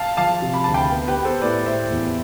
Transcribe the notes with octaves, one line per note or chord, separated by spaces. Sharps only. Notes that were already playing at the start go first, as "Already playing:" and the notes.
Already playing: F5 A5
F3 F5 A5
C3
B5
D2 A5
G5 B5
B3
G4 B4
B3
A4 C5
A2 B4 D5
A2 C5 E5
E2